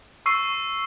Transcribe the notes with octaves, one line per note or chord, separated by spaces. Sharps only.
C#6 E6 C7 D#7